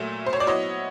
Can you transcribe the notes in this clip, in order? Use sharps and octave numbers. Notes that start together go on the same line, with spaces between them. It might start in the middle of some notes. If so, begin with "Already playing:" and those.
Already playing: A#2 F#3 A3 E5
C5
C#5
D5
F#3 B3 E4 C#5 D#5